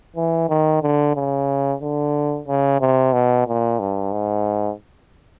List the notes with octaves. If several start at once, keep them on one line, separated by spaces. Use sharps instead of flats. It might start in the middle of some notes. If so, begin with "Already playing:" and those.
E3
D#3
D3
C#3
D3
C#3
C3
B2
A#2
G2
G#2